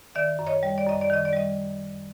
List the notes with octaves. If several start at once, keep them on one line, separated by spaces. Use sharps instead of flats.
D#3 D5 E5
F#2
C#5 D#5
G3
D5
F#2 D#5
D5
D#3 D#5
D5
G3 D#5